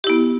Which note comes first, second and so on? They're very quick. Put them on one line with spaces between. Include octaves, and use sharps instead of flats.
G4 E4 B3